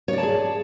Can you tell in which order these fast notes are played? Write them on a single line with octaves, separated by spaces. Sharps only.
C#5 D5 A5 G#4